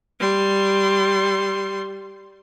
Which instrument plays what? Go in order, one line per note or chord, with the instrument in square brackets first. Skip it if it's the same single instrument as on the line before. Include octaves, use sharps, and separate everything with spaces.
[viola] G3 C6